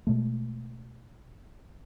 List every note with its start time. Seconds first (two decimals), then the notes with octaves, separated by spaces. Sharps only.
0.07 B2 G#3 A3